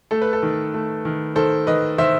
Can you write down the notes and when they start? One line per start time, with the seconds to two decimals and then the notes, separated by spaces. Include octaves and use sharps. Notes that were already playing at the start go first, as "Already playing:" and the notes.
0.11 A3 A4
0.22 B4
0.33 A4
0.43 D#3
0.74 A3
1.05 D#3
1.36 D#3 A4 C5
1.67 D#3 B4 D#5
1.98 D#3 C5 E5